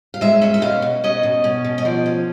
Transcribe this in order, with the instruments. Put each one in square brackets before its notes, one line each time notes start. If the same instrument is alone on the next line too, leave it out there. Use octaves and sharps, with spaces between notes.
[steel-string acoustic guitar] F5
G#3 E5
C#4 E5
E5
B2 F5
B2
C#4 D#5
B2
C#4
B2
D#5
F3 D5
C#4